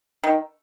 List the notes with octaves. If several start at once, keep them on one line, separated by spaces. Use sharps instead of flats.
D#3